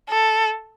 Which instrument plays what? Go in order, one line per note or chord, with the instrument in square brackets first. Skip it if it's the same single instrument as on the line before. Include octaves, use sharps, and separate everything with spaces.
[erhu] A4